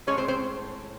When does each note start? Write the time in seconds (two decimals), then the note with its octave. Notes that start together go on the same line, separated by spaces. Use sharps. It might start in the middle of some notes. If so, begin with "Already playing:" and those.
0.07 A2 F3 G#3 C#4 C#5
0.18 C4 C5
0.28 C4 C5